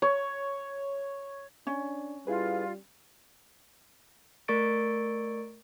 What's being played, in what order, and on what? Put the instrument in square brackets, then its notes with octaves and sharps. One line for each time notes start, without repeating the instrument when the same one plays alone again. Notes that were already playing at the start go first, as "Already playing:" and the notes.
[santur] C#5
[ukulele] C#4 [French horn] D4
[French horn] G3 [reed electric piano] E4 G#4 B4 [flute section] F4
[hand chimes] A3 A#4 D5 C#6 A6 D7